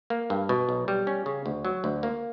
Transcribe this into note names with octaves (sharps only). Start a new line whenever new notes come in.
A#3
G2
B2
B1
G3
C#4
C#3
D2
F#3
D2
A#3